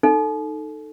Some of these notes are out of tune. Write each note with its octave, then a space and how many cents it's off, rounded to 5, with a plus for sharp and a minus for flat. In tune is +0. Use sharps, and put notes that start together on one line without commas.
D#4 -10 A4 +0